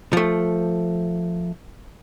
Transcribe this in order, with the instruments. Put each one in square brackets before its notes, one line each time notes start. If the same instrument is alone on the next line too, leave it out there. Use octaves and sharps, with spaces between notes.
[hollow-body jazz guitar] F3 A3